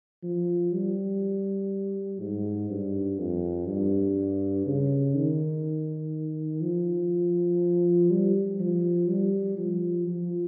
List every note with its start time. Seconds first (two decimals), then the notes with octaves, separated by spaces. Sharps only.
0.23 F3
0.73 G3
2.20 G#2
2.70 G2
3.19 F2
3.67 G2
4.66 C#3
5.16 D#3
6.62 F3
8.11 G3
8.60 F3
9.09 G3
9.58 F3
10.07 F3